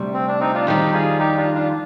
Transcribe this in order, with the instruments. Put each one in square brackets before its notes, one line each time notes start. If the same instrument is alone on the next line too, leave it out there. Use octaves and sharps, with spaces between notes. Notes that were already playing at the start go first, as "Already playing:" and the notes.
Already playing: [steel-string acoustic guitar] D2 C3 G3
[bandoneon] C4
D4
C4 D#4
D4 F4
[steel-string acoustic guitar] F2 D#3 G3 [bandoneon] D#4 G4
[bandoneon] F4 G#4
D#4 G4
D4 F4
D4 F4